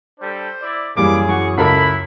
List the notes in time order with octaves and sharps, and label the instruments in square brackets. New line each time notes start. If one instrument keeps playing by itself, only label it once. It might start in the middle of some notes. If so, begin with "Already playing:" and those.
[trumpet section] G3 D4 A4 [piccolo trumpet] C5
[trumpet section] E4 D5
[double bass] F#2 [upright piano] E3 G3 A#3 [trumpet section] G#4 [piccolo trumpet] D6
[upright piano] E3 F#4 [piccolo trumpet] C#6
[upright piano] C#2 A4 A#4 [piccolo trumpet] E4 [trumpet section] B5